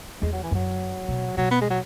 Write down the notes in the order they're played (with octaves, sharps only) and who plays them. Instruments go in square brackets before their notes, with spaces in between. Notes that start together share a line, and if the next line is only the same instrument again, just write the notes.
[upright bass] E2 [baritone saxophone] G#3
[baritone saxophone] F#3
E3
[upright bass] F#2 [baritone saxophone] F#3
[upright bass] B2
[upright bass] B2 [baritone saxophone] F#3
[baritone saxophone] B3
G#3
F#3